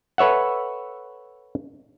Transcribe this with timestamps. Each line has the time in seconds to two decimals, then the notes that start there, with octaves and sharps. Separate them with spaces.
0.18 A4 B4 C#5 E5 F#5